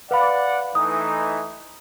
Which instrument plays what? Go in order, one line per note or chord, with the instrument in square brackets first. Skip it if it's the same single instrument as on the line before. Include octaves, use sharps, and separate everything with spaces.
[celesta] B4 F5 B5 [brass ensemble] D5 F#5
[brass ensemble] E3 A3 D#4 [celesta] D#6